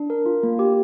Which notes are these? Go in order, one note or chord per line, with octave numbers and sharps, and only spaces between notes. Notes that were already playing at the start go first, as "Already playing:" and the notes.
Already playing: D4
A#4
F4
A#3
G4